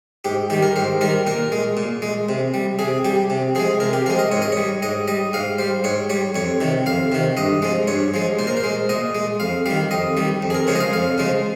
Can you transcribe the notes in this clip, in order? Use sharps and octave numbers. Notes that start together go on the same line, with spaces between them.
G#2 G4
D#3 G3 G4
A#4
G#2 C5
D#3 G3 A#4
A#2 A#4
G#3
A#2
G#3
C3
G3
C3 G#4
G3 G4
C3
F3 G#3 G#4
C3 A#4
G4
F3 G#3 A#4
D#5
G#2 C#5
D#5
G3 C#5
G#2 D#5
G3 D#5
G#2 F5
G3 C5
G#2 C#5
G3 C#5
F2 C#5
C3 D#3
F2 F5
C3 D#3
G2 D#5
F3 G#3
G2 C#5
F3 G#3
A#2 C5
A#4
C5
G#3
A#2 D#5
G#3
F2 F5
D#3 G3 F5
F2 D#5
D#3 G3
F2
G#4
A#4
C#3 F3 G#3 C#5
D#5
F5
F2 F5
C#3 F3 G#3